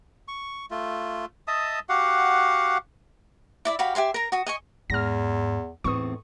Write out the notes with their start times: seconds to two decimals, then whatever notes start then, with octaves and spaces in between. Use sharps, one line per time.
0.28 C#6
0.71 A3 F4
1.48 D#5 E5 A5 D#6
1.89 F#4 G4 F5 F#5
3.65 E4 D5 E5
3.79 F#4 G4 F5 B5
3.95 G4 E5 G#5 C6
4.14 A#4 A#5
4.32 F#4 D#6
4.46 D#5 G#5 C#6
4.90 E2 G#2 F6 A#6
5.84 E2 A2 C4 D#4 C#6 D#6